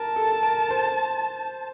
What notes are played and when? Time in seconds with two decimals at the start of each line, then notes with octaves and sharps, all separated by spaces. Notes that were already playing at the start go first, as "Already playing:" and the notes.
Already playing: A#4 A5
0.16 A4
0.43 A#4
0.70 C5